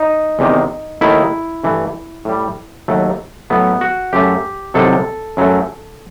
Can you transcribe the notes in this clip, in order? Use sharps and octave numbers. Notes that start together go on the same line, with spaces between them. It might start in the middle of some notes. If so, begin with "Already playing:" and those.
Already playing: D#4
E2 C3 D#3
D#2 D#3 A3 E4
G2 E3 A3
A2 G3
D#2 D#3 F#3 A3
A2 F#3 A3 B3
F#4
F#2 F#3 A3 G4
C2 C3 D#3 F#3 A4
F#2 F#3 A3